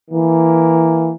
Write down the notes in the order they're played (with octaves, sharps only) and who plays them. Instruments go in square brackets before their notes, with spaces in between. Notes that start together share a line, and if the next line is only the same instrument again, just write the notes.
[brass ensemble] E3 A#3